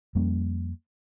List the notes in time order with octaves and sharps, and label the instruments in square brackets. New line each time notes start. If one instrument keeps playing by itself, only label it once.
[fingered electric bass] F2 G3 A#3 C#4